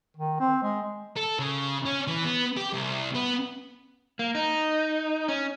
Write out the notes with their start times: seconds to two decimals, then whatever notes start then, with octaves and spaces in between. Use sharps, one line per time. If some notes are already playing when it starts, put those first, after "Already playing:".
0.17 D#3
0.40 C4
0.62 G#3
1.17 A4
1.39 C#3
1.85 C#4
2.07 E3
2.25 B3
2.57 G4
2.73 C2
3.15 B3
4.19 A#3
4.35 D#4
5.28 C#4